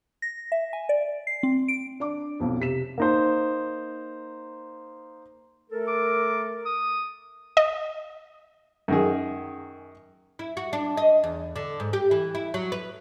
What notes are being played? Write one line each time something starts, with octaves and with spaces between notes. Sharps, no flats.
A#6
E5
G#5
D5
C7
C4
D7
D4 D5 D6
B1 F2
C3 B6 E7
A#3 D#4 C5
A3 A4 A#4
D6
D#6
D#5
F#2 D#3 G#4
E4
F#4
D4
D#5
E2
D3
G#2
G4
E3
E4
F#3
B4